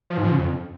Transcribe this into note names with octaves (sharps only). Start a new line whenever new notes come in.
F3
G#2
F3
C#3
F2